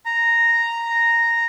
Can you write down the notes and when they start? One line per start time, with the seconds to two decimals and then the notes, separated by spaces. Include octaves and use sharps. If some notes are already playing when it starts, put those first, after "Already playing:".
0.06 A#5